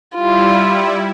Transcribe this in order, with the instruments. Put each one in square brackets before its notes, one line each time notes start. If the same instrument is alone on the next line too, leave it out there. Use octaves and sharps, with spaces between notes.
[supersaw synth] G3 E4 [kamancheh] F4